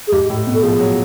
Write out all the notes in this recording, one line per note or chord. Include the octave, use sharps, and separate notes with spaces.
G#4
G#2 G4
A2
B2
A4
F3 G#4
F#3